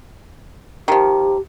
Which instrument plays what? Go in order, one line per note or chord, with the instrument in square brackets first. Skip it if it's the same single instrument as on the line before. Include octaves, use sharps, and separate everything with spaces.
[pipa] D#3 F3 [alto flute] G4